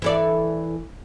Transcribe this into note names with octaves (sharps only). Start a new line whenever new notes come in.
E3 A4 D5